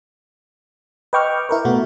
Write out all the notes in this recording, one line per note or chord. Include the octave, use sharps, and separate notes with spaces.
B4 D#5 G5 C#6 D6 F6
E4 A#4 B4
B2 A3 F#4